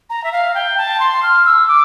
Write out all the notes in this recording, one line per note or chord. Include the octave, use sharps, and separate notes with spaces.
A#5
E5
F5
G5
A5
C6
F6
E6
D6